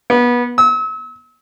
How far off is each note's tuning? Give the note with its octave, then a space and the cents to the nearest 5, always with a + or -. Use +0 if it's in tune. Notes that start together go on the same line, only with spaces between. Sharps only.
B3 -25
E6 -40